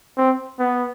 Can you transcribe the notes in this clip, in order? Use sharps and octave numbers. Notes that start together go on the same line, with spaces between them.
C4
B3